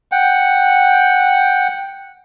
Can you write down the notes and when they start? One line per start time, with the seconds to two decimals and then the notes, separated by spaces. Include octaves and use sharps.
0.12 F#5 G5